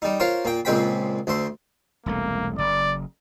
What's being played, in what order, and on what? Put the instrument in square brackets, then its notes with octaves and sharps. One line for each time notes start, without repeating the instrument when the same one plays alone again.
[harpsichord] G3 D#4
F4 A#4 C5 C#5
A#2 G5
C#2 A#2 G#3 C4 G5 B5
D2 A3 C5
[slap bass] E1 C2 A3 [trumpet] A#3
[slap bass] F#1 [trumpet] D5